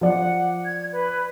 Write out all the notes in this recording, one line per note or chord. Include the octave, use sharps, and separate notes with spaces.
F3 D5 F#5
G#6
B4